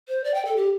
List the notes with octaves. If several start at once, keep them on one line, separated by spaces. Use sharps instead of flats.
C5
D5
G5
A4
G4